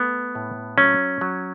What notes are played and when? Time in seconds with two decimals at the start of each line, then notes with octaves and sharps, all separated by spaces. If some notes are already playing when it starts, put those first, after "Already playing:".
Already playing: A3 B3
0.35 A2
0.78 F#3 C#4
1.21 F#3